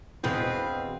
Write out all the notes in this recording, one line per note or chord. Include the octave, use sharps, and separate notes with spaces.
E2 B2 C4 G#4 B4 F5